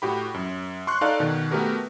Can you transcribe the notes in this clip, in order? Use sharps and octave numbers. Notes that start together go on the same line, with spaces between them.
A2 F#4 G4 B5
F#2
C6 C#6 F#6
D#4 A4 D5 F5 A5
B2 D#3
A3 B3 F#4 G4 A#4 B4